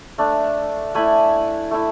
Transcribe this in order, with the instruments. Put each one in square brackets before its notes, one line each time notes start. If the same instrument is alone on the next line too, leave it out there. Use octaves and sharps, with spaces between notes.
[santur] A3 D4
A3 E4 G#5 B5
A3 E4